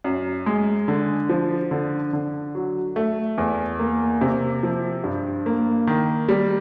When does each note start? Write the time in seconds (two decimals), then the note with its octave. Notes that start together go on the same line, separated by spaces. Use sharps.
0.04 F#2
0.46 G#3
0.88 D3
1.29 F3
1.71 D3
2.13 D3
2.55 F#3
2.96 A3
3.38 E2
3.79 A#3
4.21 C3
4.63 F3
5.04 G2
5.46 A#3
5.87 D#3
6.29 G3